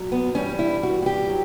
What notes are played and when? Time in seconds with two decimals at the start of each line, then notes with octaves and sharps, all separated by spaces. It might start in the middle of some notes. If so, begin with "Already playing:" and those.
Already playing: A#2 F#3
0.12 B3
0.35 G2 E3 G3 C#4
0.59 E4
0.83 F#4
1.02 F#4
1.06 G4
1.29 F#3